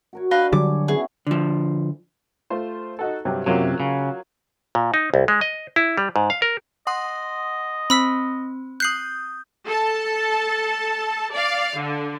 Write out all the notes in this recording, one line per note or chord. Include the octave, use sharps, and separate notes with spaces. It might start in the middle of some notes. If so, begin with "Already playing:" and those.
F#4 A#4 C#5
D4 B4 D#5 F5
D3 F#3 G3 C#5 G#5 D6
B3 C#4 E4 G#4
D3 F3
A3 F4 C5
D#4 F#4 A4
G2 C3 F#3
F#2 C3 F#3 A#3 F4
C#3
A#2
D#4
C2
G#3
D#5
E4
G3
G#2
F5
A#4
D#5 F#5 C6 D#6
C4 B5 E6 B6
D#6 F#6 G6 C7 F#7
A4 A5
D5 F5
D3